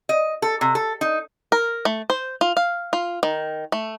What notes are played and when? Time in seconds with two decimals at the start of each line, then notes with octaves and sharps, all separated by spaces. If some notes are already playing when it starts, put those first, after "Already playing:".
0.09 D#5
0.42 A4
0.61 C3
0.75 A4
1.01 D#4
1.52 A#4
1.85 A3
2.10 C5
2.41 F4
2.57 F5
2.93 F4
3.23 D#3
3.72 A3